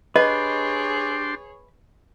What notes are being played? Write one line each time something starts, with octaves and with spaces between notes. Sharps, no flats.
D4 G4 G#4 B4 C#5 D#5 C6